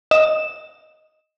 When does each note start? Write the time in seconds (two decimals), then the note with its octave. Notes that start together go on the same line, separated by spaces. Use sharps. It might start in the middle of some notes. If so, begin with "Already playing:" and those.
0.11 D#5 E7